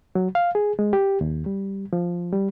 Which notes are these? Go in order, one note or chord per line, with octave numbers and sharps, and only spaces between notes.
F#3
F5
G#4
G#3
G4
D#2
G3
F3
G3